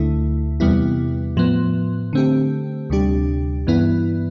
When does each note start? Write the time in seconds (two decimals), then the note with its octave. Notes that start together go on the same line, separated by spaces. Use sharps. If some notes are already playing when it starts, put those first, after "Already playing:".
Already playing: D2 D3 A3 E4
0.60 E2 C3 G3 B3 E4
1.37 A2 F3 B3
2.13 D3 A3 C4 G4
2.90 D2 C3 G3 D4 G4
3.67 G2 E3 B3 E4